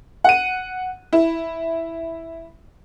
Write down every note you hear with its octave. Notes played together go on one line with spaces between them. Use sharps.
F#5 D#7
E4